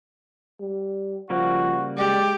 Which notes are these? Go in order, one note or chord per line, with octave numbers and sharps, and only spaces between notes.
G3
C#3 F3 G3 A#3 F#4
G#3 G4 D5